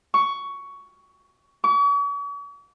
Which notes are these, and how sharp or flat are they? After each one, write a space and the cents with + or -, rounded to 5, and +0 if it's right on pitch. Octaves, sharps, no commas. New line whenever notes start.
C#6 +15
C#6 +45